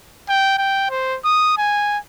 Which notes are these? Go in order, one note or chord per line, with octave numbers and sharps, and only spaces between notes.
G5
G5
C5
D#6
G#5